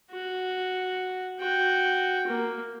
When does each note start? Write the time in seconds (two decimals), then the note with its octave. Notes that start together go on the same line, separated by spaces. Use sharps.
0.12 F#4
1.40 F#4 G5
2.28 A#3